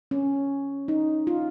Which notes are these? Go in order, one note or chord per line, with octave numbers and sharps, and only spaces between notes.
C#4
D#4
F4